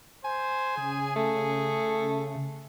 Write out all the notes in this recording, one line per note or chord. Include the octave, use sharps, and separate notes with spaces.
C5 G#5
C#3 G#4
A3